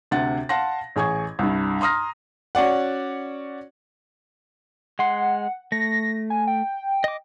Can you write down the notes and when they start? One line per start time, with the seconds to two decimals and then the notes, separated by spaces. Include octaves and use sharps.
0.11 D2 C3 F#5 A6
0.49 F5 F#5 A5 C6 A#6
0.96 A1 G#4 G#5 C#6 G#6
1.39 C2 G2
1.81 A#5 C6 D#6 F6 A#6
2.55 C#4 F#4 D5 F#5
4.99 G#3 F#5 C6
5.72 A3 A#6
6.30 G#5
6.47 G5
7.04 D#5 D6